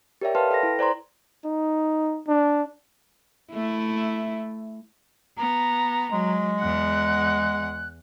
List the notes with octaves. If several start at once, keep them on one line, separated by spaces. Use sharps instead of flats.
G4 A#4 C#5 D5 E5 G5
B4 F5 G5 A5 C6 F6
A4 B4 G5 B5 A#6
E4
C5 D5 A#5 C6
D#4
D4
A3 E4
B3 A#5
F#3 G#3
E2 F#5 F#6